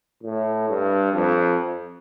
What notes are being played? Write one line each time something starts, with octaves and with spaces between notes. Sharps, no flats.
A2
G2
F2